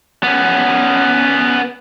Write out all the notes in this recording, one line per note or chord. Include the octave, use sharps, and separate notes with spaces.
B3 C#4